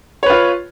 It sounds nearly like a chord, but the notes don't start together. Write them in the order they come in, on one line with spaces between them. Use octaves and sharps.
C#5 B4 F4